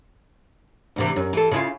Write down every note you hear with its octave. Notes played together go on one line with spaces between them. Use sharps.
D2 C3 E3
F#2
E3 A4
C#3 E4 F4